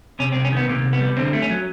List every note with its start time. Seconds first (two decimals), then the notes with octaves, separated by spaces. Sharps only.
0.19 C3 C#4
0.32 C2 C4
0.45 C#4
0.52 D#3 B3
0.69 C3 A#3
0.85 C2
0.93 B3
1.01 G3
1.17 D3 C4
1.33 A3
1.42 C#4
1.50 F#3